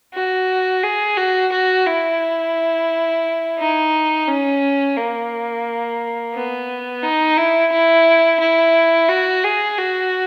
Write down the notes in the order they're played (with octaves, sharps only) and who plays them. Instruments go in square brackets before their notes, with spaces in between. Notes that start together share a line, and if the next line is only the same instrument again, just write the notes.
[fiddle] F#4
G#4
F#4
F#4
E4
D#4
C#4
A#3
B3
D#4
E4
E4
E4
F#4
G#4
F#4